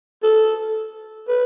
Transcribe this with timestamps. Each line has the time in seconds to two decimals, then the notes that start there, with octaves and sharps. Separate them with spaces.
0.23 A4
1.28 B4